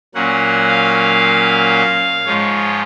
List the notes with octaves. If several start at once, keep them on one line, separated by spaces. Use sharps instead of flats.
A#2 F#3 A#3 C#4 F#5
F5
G#2 F3 G#3 C#5